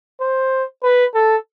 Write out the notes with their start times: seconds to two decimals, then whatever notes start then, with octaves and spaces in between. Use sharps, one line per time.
0.21 C5
0.83 B4
1.14 A4